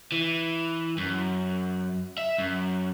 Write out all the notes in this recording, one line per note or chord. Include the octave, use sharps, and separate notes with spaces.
E3
F#2
E5
F#2